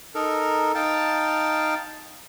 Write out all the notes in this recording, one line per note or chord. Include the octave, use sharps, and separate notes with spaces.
D#4 A4 A#4
D#4 F5 G5 A5